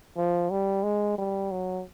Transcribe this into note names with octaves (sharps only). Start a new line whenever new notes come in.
F3
G3
G#3
G3
F#3